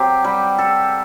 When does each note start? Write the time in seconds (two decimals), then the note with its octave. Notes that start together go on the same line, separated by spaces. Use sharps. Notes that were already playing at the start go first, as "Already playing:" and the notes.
Already playing: F#3 C4 G4
0.24 G3
0.58 A4